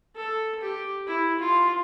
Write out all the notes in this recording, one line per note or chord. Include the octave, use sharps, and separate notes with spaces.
A4
G4
E4
F4